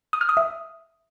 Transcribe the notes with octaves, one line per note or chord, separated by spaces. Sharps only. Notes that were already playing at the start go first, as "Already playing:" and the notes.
D#6
F6
D#6
E5